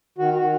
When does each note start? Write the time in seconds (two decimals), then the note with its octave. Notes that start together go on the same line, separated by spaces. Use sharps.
0.18 D#3 F#4
0.34 F#4
0.42 D#3